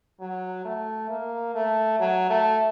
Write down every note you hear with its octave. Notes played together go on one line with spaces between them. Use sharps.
F#3
A3
A#3
A3
F#3
A3